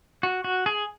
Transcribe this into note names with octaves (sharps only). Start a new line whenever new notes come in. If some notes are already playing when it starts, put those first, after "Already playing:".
F#4
F#4
G#4